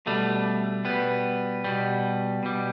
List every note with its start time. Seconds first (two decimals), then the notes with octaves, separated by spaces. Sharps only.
0.06 B2 G3 A3
0.85 B2 G3 B3
1.64 B2 G3
2.43 B2 G3